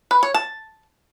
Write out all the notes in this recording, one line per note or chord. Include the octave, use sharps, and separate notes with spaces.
B4
C#5
A5